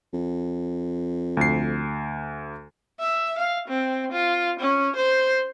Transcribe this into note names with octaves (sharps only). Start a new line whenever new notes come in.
F2
D2 C7
E5
F5
C4
F4
C#4
C5